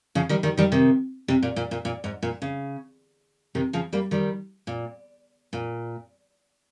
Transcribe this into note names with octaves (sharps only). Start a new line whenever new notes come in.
C#3 F3
D#3 G3
D#3 G3
D#3 G3
C3 D#3
C3
A#2
A#2
A#2
A#2
G#2
A#2
C#3
C3 D#3
C#3 F3
G3 A#3
D#3 G3
A#2
A#2